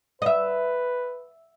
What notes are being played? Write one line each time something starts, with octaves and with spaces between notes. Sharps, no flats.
B4 D#5 E5